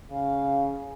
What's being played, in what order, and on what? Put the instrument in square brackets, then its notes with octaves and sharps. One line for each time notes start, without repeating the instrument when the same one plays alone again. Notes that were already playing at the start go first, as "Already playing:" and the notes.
[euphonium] C#3 [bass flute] F5